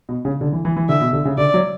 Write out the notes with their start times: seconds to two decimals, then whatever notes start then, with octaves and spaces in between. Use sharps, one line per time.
0.09 B2
0.25 C#3
0.41 D3
0.52 E3
0.65 E3
0.76 E3
0.89 D3 E5
1.01 B2
1.13 D3
1.25 C#3
1.38 D3 D5
1.54 F#3